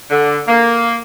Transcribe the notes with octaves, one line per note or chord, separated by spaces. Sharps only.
D3
A#3